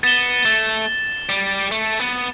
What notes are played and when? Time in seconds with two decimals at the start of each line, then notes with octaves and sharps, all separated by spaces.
0.03 B3 A6 E7 G7
0.45 A3
1.29 G3
1.71 A3
1.99 B3